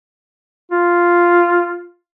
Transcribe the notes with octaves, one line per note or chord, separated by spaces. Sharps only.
F4